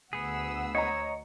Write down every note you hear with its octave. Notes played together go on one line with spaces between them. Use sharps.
D2 B3 G#4 F#5 E6
C#5 D#5 A#5